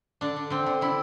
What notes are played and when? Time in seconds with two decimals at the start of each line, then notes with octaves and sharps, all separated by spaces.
0.21 D3 D4
0.36 D3
0.50 D3 C4
0.66 D3
0.81 D3 E4